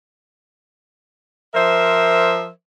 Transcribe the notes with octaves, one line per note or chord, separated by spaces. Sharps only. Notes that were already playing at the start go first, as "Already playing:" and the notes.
F3 A#4 C5 E5